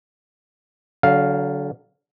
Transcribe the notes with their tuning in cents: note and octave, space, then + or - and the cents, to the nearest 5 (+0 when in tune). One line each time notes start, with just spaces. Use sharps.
D3 -25 F#3 +15 F5 +0